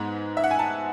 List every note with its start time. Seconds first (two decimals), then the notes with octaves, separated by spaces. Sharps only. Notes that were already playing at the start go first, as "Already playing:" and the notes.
Already playing: G#2 G#3 B3
0.37 E5
0.44 F#5
0.51 G#5
0.59 A5